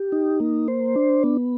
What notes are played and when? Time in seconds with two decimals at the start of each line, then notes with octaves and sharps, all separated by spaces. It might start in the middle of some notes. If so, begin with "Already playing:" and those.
Already playing: G4
0.12 D#4
0.40 A#3
0.68 C5
0.96 D4
1.24 B3